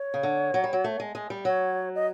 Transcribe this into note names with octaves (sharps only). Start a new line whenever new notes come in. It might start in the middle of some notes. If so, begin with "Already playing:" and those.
Already playing: C#5
C#3
D3
F#3
G3
F#3
A3
G#3
G#3
G3
F#3 C#5
D#5